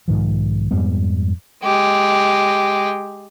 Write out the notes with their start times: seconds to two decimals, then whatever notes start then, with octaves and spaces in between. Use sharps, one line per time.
0.08 B1 G#2 D#3 F3
0.71 F2 G#2 G3 B3
1.63 G#3 G4